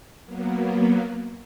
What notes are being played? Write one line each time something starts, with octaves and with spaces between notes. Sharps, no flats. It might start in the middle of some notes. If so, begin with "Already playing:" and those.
F#3 A#3 B3